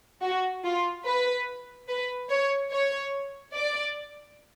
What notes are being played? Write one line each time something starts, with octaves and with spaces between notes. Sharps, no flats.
F#4
F4
B4
B4
C#5
C#5
D5